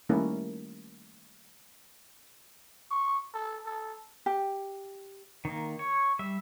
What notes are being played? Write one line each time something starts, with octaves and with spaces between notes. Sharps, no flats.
D#3 G3 A3 A#3 C#4 E4
C#6
A4
A4
G4
D#3 A#3
C#5
G3 E5